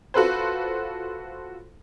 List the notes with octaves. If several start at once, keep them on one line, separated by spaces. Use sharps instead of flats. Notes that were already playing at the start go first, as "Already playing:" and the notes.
F4 F#4 A4 B4 C5